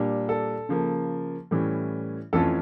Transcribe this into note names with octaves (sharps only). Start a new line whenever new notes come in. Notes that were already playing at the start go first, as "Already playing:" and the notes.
Already playing: A#2 G3 D4
A4
C#3 F3 A#3
A2 E3 G3 C#4
F2 E3 A3 C#4 F4 A4